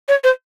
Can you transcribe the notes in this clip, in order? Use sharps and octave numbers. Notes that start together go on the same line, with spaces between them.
C#5
C5